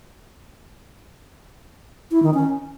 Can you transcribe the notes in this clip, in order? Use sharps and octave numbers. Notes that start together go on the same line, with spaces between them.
E4
D#3
C#4